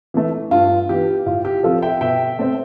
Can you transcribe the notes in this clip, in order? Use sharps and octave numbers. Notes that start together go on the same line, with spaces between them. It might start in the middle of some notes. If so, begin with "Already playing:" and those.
E3 A3
G2 F4
E3 B3 G4
A2 F4
G4
F3 C4 F4 A4
E5 G5
B2 E5 G5
A3 C4